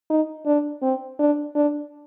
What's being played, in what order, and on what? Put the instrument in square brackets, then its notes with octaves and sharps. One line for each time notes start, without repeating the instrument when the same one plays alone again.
[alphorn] D#4
D4
C4
D4
D4